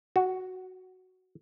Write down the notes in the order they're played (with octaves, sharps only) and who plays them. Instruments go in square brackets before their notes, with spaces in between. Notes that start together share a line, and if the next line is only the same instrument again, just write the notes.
[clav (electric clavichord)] F#4